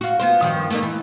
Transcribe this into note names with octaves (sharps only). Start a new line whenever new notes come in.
F4 F#4
B3 F4 C5
G2 D#3 F3
A3 A#3 D#4
E3